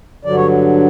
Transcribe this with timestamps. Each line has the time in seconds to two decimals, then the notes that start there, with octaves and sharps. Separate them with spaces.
0.25 G2 D3 F#3 D5
0.36 C#5